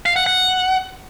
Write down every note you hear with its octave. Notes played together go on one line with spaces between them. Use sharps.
F5
F#5
F#5